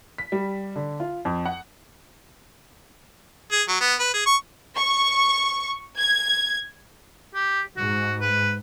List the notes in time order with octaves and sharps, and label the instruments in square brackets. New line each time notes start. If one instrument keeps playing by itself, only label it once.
[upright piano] B6
G3
D3
F4
F2
F#5
[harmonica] G#4
F#3
B3
B4
G#4
C#6
[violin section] C#6
G#6
[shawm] G4
[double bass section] G#2 [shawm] F#4
[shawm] B4